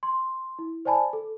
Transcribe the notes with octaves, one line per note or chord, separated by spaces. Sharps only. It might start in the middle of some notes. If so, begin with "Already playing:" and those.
C6
E4
C5 D5 G#5 A5 B5
A4